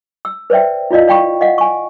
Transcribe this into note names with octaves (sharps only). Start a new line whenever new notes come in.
E6
B4 C5 D5 E5 G5
E4 F4 D5 D#5 F5
D5 F5 G5 B5 C#6
D#5 F5 F#5
G#5 C#6